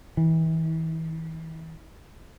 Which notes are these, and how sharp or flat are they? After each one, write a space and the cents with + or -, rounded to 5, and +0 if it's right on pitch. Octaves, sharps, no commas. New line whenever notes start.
E3 -35